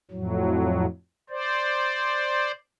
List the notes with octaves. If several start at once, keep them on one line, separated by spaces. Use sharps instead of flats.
F2 A2 F#3
C5 D5